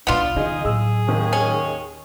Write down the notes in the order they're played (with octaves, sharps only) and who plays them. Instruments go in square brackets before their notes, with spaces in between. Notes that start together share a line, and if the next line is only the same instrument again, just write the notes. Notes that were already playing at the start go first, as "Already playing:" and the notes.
[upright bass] C2 B2 [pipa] B3 F4 [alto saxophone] D4
[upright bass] D#3 [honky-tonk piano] D#4 [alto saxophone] G#4
[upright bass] A2 F#3 [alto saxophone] G#4 [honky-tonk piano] E6
[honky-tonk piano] D#2 D#3
[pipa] C#4